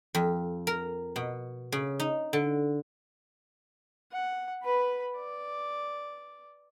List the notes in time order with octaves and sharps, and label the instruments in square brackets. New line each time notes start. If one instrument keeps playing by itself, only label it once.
[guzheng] F2
A#4
B2
C#3
D#4
D3
[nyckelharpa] F#5
B4 B5
D5